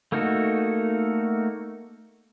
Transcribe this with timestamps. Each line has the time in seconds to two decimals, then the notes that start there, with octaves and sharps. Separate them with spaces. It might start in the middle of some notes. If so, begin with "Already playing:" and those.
0.12 A3 A#3 D#4 F#4 A4